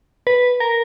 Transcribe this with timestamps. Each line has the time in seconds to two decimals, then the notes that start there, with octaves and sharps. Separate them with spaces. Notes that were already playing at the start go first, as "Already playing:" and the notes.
0.27 B4
0.60 A#4